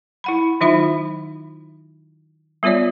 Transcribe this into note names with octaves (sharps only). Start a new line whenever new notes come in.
E4 F#5 B5
D#3 F#3 D#4 F4 E5 B5
G3 B3 F4 C#5 D5